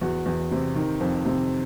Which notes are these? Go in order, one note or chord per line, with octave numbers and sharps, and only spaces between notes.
E2 F#4
E2
C3
D#3
F2
C3